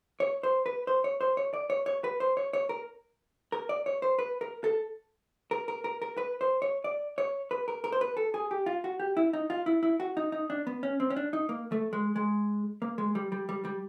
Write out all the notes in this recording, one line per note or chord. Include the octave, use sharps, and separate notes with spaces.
C#5
C5
B4
C5
C#5
C5
C#5
D5
C#5
C#5
B4
C5
C#5
C#5
A#4
A#4
D5
C#5
C5
B4
A#4
A4
A#4
A#4
A#4
A#4
B4
C5
C#5
D5
C#5
B4
A#4
A#4
C5
B4
A4
G#4
G4
F4
F#4
G4
E4
D#4
F4
E4
E4
F#4
D#4
D#4
D4
B3
C#4
C4
C#4
D4
D#4
A#3
A3
G#3
G#3
A#3
G#3
G3
G3
G3
G3